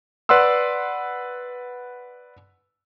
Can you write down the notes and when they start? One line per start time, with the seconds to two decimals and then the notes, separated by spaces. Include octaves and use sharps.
0.29 B4 D5 F#5 C6 E6